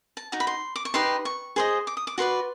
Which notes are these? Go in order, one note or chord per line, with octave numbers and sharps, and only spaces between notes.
A5
D#4 F#4
B5
C6
D6
C#6
D#4 G4 B4 C6
C#6
G#4 C5 D#5
D6
D#6
D6
F#4 B4 D5 C6